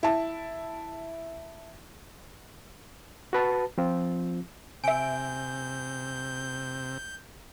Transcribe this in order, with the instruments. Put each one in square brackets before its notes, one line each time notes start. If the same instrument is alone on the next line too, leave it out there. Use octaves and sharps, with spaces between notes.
[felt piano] E4 A5
[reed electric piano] F#4 B4 A5
F3 C4 F4
[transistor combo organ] C3 [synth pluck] E5 D7 [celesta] G#5 [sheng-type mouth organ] G6